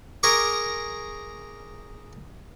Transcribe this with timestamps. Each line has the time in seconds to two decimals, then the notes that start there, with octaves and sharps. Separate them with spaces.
0.23 G#4 A#4 A#5 C#6 D6